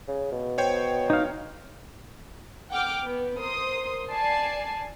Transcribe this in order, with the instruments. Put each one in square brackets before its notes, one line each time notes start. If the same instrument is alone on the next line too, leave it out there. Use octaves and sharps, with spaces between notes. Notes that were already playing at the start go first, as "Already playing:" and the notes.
[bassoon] C#3
B2
[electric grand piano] C5 C#5 G5
[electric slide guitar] D#4 F5
[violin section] F#5 G5 D6 F6
B3
A#4 C5 C6 D#6
D5 G#5 A5 C7